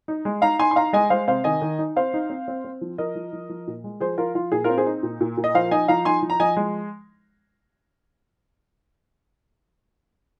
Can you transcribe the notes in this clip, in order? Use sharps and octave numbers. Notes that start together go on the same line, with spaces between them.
D#4
G#3
D#4 F5 A#5
D#4 G#5 C6
C6
D#4 F5 A#5
G#3 D#5 G#5
G#3 C5 F5
C3 C5 F5
D#3 D#5 G#5
D#3
D#4
C4 C5 F5
D#4
C4
C4
C4
F3
F3 A#4 D#5
F3
F3
F3
A#2
G#3
F3 G#4 C5
F3 F4 A#4
F3 F4
A#2 G#4
F4 A#4
C4
G#4 C5
D#4
A#2
A#2
A#2
D#5
F3 C5 F5
D#4 D#5 G#5
F3 F5 A#5
D#4 G#5 C6
F3
A#5
F3 D#5 G#5
G#3